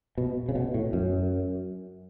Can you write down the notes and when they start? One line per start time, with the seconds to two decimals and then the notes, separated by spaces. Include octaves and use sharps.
0.18 B2
0.49 C#3
0.55 B2
0.74 A2
0.93 F#2